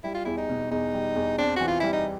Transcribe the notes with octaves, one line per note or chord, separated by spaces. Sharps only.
G3 E4
F4
E2 E4
D#4
B2
E2 D#4
G3
E2
C4 D4
E3 F#4
F4
G3 E4
D#4